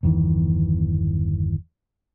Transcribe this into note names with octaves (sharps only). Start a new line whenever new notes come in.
G1 E2 D#3 E3